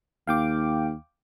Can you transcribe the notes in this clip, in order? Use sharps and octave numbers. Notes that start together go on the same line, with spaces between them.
D#2 F5 G5 D6